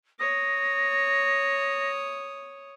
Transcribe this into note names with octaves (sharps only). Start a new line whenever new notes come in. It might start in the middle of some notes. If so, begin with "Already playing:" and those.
C#5 D#6 A#6